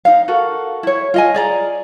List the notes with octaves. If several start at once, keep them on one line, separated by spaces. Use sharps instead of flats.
D#4 F5
F#4 A4 A#4
E4 C#5
F4 D#5 G#5
G#4 D5 A#5